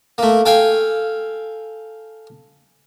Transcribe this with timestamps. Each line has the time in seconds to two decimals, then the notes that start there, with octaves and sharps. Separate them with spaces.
0.18 A3 A#3
0.46 A4 F5 G5 G#5